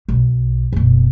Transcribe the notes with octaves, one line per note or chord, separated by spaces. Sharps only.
B1
F#1 B2